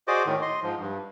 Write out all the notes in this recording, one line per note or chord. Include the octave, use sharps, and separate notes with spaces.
F#4 G#4 C5 D5 D#5 D6
A2 D#3
D#5 C6
G#2 F3
G2